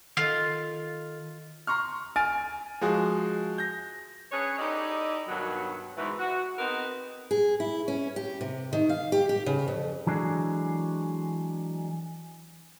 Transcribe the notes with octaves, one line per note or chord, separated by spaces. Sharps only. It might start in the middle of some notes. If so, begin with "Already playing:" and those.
D#3 F4 A4 D#5
A#5 C6 C#6 F6
G#5 F6 A6 D7
F3 G#3 F#4 G#4
G6 A#6
C#4 D4 G#4 B4 C#5
D#4 E4 G4 A4 D5 D#5
G2 B2 D#3 F#3
G#2 B2 E3
F#4
B3 C4 D#4 G#4 A#4 B4
G#4
E4
C#4
G4
C3
D#3
F5
G4
G4
C#3
F2
E3 F#3 G#3 D4 G#4 A4